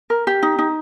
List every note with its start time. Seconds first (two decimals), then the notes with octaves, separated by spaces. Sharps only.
0.10 A#4
0.27 G4
0.43 D#4
0.59 D#4